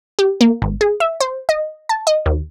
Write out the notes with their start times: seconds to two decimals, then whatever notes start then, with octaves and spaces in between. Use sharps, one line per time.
0.19 G4
0.41 A#3
0.62 G#1
0.81 G#4
1.00 E5
1.20 C5
1.49 D#5
1.89 A5
2.07 D#5
2.26 D#2